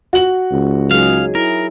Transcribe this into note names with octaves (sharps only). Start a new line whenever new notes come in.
F#4 F#7
C#2
F#3 D#4 G#4 F5
E4 A#4